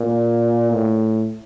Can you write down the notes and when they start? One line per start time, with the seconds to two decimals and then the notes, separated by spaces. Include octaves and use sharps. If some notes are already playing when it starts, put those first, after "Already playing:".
Already playing: A#2
0.72 A2